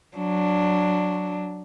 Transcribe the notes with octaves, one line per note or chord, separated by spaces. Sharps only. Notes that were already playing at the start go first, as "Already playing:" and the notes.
F#3 D4